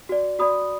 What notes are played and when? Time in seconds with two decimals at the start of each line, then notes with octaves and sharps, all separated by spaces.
0.09 F#4 D5
0.39 F#4 D5 B5 D#6